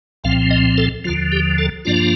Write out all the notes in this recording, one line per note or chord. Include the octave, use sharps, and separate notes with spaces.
C2 A#2 F3 C4 F5
D#5
A4
D#2 D3 F3 F4
G4
A4
G2 F3 A#3 D4 F4 D5